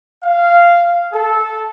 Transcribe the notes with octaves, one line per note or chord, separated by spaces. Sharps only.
F5
A4